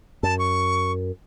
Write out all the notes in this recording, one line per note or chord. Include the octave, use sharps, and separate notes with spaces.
F#2 A5
C#6